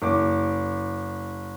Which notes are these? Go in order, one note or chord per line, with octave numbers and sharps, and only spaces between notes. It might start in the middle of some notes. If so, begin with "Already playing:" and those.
F#1 D6